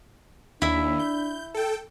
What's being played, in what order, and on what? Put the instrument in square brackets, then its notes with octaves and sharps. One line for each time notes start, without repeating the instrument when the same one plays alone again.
[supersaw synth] D#2 [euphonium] D4 [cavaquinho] E4 E5
[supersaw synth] G6
A4 G5